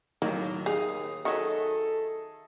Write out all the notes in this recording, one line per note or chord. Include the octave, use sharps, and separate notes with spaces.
A2 D#3 F#3 A#3
D#2 G#4 F5 D#6
D#3 F#3 G#4 A4 D#5 E5